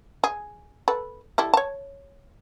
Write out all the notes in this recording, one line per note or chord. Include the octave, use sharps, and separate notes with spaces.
G#4
A4 B4
G3 E4 A4
C#5 A5